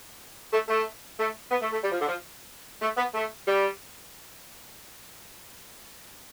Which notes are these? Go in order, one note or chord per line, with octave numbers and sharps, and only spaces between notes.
A3
A3
A3
B3
A3
A3
G3
F3
D3
F3
A3
B3
A3
G3